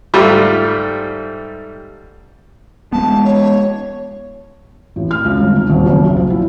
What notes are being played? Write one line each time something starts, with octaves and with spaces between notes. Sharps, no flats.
G#2 G3 A3 F4
G#3 B3 A5
C#5
A1
F6
C#2
G1
D#3
D#1
F#1
B1
F3
E4